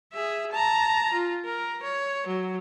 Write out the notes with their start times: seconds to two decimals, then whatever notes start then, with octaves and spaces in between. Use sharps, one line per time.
0.13 G#4 E5
0.52 A5 A#5
1.12 F4
1.45 A#4
1.83 C#5
2.27 F#3